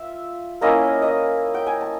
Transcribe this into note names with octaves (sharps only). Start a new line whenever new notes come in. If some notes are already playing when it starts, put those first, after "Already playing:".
Already playing: F4 E5
A#3 C#4 E4 D#5
D#5
G5
G#5
A5